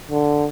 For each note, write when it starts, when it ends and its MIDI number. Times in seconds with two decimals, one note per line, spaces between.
0.11 0.47 50